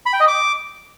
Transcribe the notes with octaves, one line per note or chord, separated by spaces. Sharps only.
B5
G5
D#5
D6